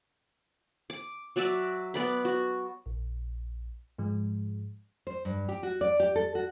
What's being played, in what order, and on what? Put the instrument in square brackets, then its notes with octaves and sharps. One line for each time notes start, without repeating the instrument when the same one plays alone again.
[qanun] D6
F#3 F#4 D5 E5
B3 D5 B5
F#4
[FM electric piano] A#1
G#2 F3 G#3
[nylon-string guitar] C5
G2
G4
F#4
D5
G4
A4
F#4